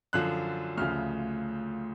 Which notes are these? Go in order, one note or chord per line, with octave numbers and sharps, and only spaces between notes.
F#2 D3 F3 F#6
D2 C#3 F3 F6